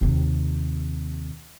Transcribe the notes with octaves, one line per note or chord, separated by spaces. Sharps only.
D#2 C3